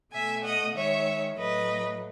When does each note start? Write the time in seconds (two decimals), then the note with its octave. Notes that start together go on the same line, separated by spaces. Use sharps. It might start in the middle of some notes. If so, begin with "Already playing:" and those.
0.14 B2 A3 E5 G#5
0.45 D#5 F#5
0.76 D#3 G#3 C#5 E5
1.38 A2 F#3 A3 B4 D#5